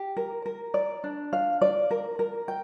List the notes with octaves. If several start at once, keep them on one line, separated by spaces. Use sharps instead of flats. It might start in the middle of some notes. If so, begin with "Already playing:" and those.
Already playing: G4
A#4
A#4
D5
D4
F5
D5
A#4
A#4
G5